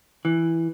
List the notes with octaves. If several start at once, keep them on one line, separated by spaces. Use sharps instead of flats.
E3